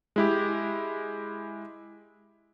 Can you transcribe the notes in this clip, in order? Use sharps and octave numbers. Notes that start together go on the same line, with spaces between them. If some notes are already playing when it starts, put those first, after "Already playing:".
G#3 E4 G4